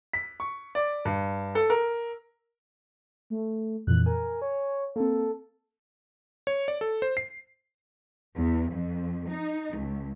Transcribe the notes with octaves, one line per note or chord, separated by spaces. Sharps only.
B6
C#6
D5
G2
A4
A#4
A3
F2 A#2 E3 F#6
A#4 G#5
C#5
A#3 C4 A4
C#5
D5
A4
C5
C7
E2
F2
D#4
C#2